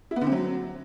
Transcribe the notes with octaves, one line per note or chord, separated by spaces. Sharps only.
E4
B3
D3
C4
F#3